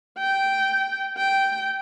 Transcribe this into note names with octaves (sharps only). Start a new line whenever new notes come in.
G5
G5